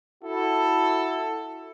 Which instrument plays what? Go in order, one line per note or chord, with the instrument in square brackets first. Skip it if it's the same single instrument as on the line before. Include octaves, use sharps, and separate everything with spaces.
[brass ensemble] E4 F#4 A4